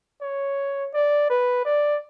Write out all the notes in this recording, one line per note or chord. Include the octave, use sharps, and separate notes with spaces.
C#5
D5
B4
D5